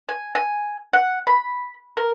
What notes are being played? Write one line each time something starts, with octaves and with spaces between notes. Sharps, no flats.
G#5
G#5
F#5
B5
A#4